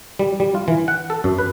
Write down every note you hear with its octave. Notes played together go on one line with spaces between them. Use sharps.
G3
G3
F4
E3
F#5
A4
F#2
B4